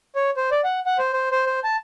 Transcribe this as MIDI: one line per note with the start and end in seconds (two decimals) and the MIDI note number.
0.16 0.30 73
0.37 0.49 72
0.51 0.61 74
0.64 0.80 78
0.86 0.97 78
0.98 1.13 72
1.13 1.29 72
1.31 1.46 72
1.46 1.59 72
1.64 1.76 81